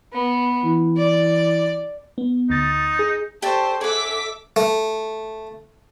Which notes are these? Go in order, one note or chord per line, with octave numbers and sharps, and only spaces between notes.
B3
E3
D5
B3
D2 D#4 A6
G#4
G4 A4 C5 D5 A5 C#6
G#4 A4 E5 F#5 D6 B6
A3